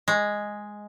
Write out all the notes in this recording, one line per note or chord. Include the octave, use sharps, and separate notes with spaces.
G#3